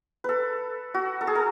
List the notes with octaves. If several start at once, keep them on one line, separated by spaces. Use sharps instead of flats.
A4 B4
F#4
A4
G#4
A4